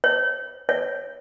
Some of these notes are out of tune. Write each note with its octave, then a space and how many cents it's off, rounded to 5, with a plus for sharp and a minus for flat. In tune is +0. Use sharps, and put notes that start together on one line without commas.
C#5 -20
C#5 +5